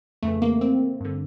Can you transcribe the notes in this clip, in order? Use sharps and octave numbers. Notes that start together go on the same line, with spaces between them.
F2 C#3 E3 A3
A#3
C4
G2 D3